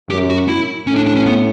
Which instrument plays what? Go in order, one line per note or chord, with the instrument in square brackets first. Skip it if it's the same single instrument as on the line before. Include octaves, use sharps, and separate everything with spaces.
[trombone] F#2 [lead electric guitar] G4
[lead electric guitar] F#4
E4
[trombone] A2 [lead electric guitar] C#4
[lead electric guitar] D4
D4
C#4
B3